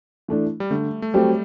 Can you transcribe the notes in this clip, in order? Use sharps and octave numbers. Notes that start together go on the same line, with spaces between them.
E3 A3 D4
G3
D3 A3
A3
F#3 G3 A3 C4 G4